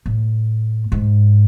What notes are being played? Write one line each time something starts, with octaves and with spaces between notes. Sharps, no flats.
A2
G#2